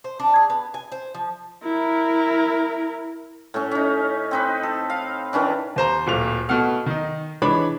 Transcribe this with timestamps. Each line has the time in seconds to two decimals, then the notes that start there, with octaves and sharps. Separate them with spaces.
0.04 C5
0.20 D4
0.36 G#4
0.50 B3
0.74 G#5
0.92 C5
1.14 F3
1.64 E4 A#4
3.54 A2 C#4
3.71 C#4 D#4
4.31 C4 D#4 B4
4.63 A4
4.90 F5
5.33 D#3 E3 C#4 D4
5.76 D#2 C5 A#5
6.07 D1 A#2 A3 F7
6.49 B2 A3 F#5 F6
6.86 D#3 D#4
7.42 E3 G#3 D4 C#5 B5 D6